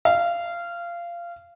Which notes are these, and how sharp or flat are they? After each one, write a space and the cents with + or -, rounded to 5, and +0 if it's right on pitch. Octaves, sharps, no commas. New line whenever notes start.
F5 -20